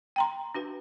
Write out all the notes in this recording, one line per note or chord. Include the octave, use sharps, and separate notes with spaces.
G5 A#5 C6
D4 F#4 B4